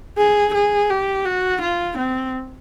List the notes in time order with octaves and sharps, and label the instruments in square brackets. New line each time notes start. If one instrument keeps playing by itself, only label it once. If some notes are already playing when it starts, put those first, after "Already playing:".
[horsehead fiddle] G#4
G#4
G4
F#4
F4
C4